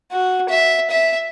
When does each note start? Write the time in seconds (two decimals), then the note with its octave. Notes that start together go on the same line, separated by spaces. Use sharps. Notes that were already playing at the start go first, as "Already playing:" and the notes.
0.12 F#4
0.49 E5
0.90 E5